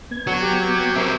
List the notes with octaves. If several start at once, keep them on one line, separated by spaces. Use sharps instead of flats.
B3 G#6
D3 F#4 C#5
G4
C4 A#4 C5 E5 B5